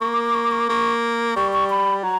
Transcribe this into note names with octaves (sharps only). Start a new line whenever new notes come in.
A#3 C#6
D6
D6
C#6
D6
C#6
D6
A#3 C#6
G3 C#6
C#6
B5
F#3 A#5